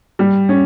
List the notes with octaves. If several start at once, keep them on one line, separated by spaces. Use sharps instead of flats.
G3
C#4